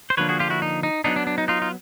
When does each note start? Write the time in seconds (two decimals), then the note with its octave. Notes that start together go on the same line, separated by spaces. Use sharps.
0.10 C5
0.17 D3 F3 A#3 D4 B4 C#5
0.29 F#4 G#4
0.39 F4 G4
0.50 E4 F#4
0.62 D#4
0.83 D#4
1.04 F#3 B3 D4 D#4
1.16 D4
1.27 D4
1.38 D#4
1.48 D#4 F4
1.62 F4